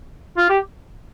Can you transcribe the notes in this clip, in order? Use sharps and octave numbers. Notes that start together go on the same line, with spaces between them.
F4
G4